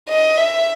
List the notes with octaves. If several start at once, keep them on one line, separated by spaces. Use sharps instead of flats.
D#5
E5